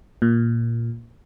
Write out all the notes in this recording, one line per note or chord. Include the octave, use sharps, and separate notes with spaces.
A#2